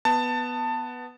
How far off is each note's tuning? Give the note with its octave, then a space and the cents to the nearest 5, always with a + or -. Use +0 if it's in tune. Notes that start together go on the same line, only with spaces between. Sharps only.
B3 +0 A5 +15